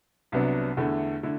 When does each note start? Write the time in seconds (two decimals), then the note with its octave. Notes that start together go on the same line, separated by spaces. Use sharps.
0.32 C2 C3 F#3 B3 D4
0.77 E2 D3 A3 E4
1.23 D3 A3 E4